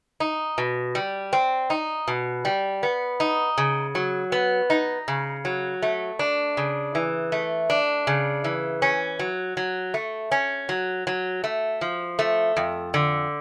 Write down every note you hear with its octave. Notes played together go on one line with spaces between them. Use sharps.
D#4
B2
G3
C4
D#4
B2
G3
B3
D#4
C#3
F#3
B3
D#4
C#3
F#3
A3
D4
C#3
E3
A3
D4
C#3
E3
C#4
F#3
F#3
A3
C#4
F#3
F#3
A3
F3
A3
F2
D3